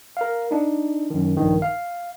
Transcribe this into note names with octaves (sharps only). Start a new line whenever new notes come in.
A#4 F5
D4 D#4
F#2 D#3
A#1 G2 D#3
F5